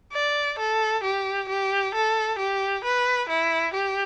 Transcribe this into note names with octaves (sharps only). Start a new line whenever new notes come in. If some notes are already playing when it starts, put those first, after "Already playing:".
D5
A4
G4
G4
A4
G4
B4
E4
G4